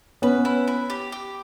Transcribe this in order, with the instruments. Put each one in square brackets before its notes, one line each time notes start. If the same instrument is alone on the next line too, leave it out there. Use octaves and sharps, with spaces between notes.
[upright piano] B3 C#4 [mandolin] B4
[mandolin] E4
E4
G4
G4